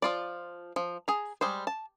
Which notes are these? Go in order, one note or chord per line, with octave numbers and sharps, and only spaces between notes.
F3 F4 D5
F3
G#4 A#5
G3 G#3 C5
A5